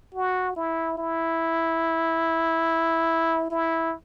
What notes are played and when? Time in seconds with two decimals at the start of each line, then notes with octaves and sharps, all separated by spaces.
0.15 F#4
0.56 E4
0.98 E4
3.50 E4